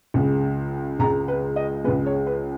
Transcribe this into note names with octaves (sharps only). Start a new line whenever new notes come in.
C#2 C#3 G#3
C#2 C#3 G#3 A#5
B4
D#5
C#2 C#3 G#3 B4
C#5
B4